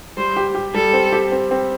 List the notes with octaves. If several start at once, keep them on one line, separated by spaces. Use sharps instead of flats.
G3 C5
G4
G4
G3 A4
C4
G4
C4
C4